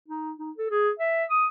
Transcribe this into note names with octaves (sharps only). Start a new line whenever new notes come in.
D#4
D#4
A4
G#4
E5
D#6